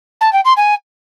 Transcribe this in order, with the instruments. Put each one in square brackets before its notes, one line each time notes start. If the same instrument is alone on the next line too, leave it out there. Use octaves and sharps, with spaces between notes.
[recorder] A5
G5
C6
G#5